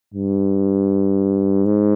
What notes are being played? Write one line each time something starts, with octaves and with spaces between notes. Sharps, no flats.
G2
G#2